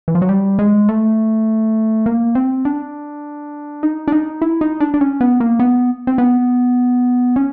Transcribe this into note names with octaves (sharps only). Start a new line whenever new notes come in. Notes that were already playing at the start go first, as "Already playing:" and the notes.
E3
F3
F#3
G3
G#3
A3
A#3
C4
D4
D#4
D4
D#4
E4
D#4
D4
D4
C#4
B3
A#3
B3
C4
B3
C#4